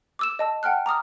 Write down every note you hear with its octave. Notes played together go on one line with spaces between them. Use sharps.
D6 E6 E7
D#5 A5 E6
F#5 G5 A5 F6 F#6
A#5 D6 D#6 F6